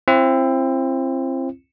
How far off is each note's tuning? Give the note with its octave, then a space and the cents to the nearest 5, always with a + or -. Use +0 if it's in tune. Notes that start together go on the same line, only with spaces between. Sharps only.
C4 +20 E4 +45